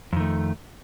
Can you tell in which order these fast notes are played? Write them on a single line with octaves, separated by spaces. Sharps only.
F2 D#3 A3